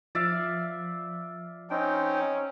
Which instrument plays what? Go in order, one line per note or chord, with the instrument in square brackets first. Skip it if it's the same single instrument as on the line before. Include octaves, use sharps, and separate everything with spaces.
[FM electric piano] F3 [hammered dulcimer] D5 E5 F5
[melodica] C4 D#4 G5 [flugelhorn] C#4